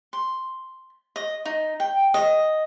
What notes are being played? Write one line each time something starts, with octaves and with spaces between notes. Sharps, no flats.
C6
D#5
D#4
G5
D#5